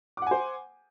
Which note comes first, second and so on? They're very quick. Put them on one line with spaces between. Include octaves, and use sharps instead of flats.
D6 F#5 G#5 C5